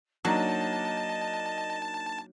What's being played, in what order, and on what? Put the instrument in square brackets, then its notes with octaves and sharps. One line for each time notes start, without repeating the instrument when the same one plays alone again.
[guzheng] F#3 [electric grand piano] A#3 D4 D#4 [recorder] D#5 [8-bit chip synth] A5